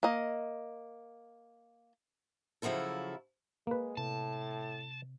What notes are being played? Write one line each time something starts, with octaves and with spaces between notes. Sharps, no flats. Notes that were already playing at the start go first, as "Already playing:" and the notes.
A#3 D#5
C#3 F3 F#3 E4 A4
G#3 A#3 B4
A2 C3 A5